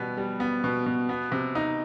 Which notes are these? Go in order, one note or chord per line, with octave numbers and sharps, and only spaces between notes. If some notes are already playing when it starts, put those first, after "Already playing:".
Already playing: B2 G3 B3
G3
B3
B2
B2
B3
C3
D#4